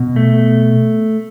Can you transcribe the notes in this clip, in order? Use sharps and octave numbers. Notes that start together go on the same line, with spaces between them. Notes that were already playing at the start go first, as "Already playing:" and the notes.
Already playing: B2
A3